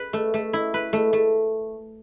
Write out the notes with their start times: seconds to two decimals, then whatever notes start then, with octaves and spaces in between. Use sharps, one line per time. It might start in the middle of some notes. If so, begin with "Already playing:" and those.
Already playing: B4
0.13 A3
0.34 A3
0.53 E4
0.74 B4
0.93 A3
1.13 A3